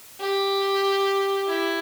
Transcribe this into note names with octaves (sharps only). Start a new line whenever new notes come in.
G4
E4